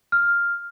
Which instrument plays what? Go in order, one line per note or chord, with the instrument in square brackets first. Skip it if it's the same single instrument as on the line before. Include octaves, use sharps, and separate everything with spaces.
[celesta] F6